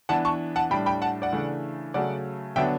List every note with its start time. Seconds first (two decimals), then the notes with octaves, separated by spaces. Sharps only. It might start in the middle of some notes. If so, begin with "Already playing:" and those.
0.09 E3 B3 D4 F#5 A5
0.25 A5 C#6
0.56 F#5 A5
0.70 A2 G3 D4 G5 B5
0.86 G5 B5
1.02 F#5 A5
1.22 D5 F#5
1.32 C#3 E3 A3 D4
1.94 C#3 F#3 A3 D5 F#5
2.56 D3 F#3 B3 D4 E5 G5